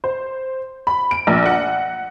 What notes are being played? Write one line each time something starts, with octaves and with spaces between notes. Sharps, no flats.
C5
B5
D7
A#1
F#5